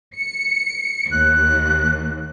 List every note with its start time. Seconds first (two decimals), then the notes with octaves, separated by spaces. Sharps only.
0.16 C#7
1.12 D#2 F#6